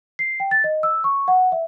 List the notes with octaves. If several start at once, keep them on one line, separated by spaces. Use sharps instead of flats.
C7
G5
A6
D#5
E6
C#6
F#5
E5